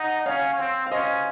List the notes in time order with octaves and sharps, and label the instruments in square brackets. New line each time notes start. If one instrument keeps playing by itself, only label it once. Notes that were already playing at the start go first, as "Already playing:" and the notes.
Already playing: [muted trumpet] D#4 [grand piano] F#5
[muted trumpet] C#4 [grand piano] C#5 F5
[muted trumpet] C4
[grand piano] F5
[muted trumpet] C#4 [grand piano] C5 D#5